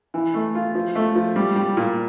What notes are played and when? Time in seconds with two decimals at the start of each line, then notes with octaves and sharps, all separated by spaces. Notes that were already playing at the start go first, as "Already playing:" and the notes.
0.14 E3
0.34 A3
0.55 F4
0.75 F3
0.95 A3
1.15 F3
1.36 G3
1.56 G3
1.77 A#2